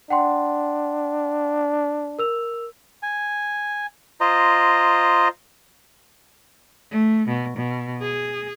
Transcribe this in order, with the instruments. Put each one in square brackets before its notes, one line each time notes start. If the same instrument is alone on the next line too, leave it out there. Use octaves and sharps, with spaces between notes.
[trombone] D4 [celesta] F#5 G5 C6
[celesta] A#4 E6 F7
[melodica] G#5
F4 C5 D#5 A#5
[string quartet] A3
B2
B2
G#4